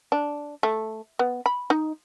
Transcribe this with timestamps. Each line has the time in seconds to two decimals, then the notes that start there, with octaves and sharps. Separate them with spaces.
0.12 D4
0.63 A3
1.19 B3
1.46 B5
1.70 D#4